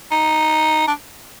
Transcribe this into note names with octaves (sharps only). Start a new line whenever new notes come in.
D#4
D4